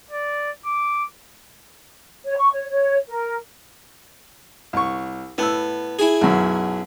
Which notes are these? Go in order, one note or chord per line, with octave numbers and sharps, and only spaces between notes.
D5
D6
C#5
C#6
C#5
C#5
A#4
C2 C#6
A2 B3 E6
E4 G#4
B1 F#2